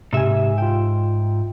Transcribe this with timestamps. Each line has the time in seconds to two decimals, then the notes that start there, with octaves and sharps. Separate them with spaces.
0.13 G#2 C3 G4 E5 G#5
0.58 F4 G5